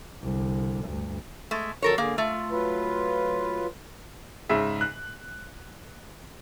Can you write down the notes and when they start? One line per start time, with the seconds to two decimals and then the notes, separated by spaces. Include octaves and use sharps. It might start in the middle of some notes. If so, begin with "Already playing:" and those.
0.23 C2 D3
0.85 D2 G2
1.51 G#3 A3
1.82 F2 D3 F#3 A4 A#4 C#5
1.98 D3 A#3 G#4
2.18 A3 F4
2.51 F#3 F4 B4
4.49 G#2 C#3 E5
4.81 F#6